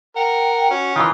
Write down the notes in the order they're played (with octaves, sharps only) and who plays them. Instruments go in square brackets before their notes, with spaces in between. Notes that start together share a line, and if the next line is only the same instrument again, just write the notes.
[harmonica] A#4 [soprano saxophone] F#5 [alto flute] G5
[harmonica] C#4 [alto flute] F#4
[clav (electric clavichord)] D#3 E3 [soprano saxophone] F4 [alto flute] B5